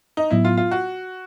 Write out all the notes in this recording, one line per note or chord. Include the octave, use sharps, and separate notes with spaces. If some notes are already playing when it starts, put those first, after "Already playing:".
D#4
A2 F#3 B3 E4
F4
F4
F#4